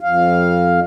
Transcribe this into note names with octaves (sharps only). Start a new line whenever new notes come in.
F2 F5